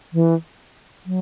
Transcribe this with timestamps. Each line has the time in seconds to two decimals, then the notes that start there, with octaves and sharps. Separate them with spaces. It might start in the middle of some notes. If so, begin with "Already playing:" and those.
0.13 E3
1.06 F#3